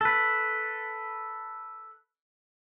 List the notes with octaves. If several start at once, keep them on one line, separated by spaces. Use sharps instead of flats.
A4 B4